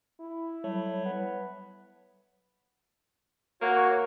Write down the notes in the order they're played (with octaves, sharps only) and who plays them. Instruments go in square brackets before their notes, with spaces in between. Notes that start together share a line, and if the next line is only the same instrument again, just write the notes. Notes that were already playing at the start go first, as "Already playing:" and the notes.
[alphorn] E4
[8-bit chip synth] F#3 G3 C#5 [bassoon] A3
[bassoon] B3
[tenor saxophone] A#3 [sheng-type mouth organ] F#4 C#5
[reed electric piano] C#6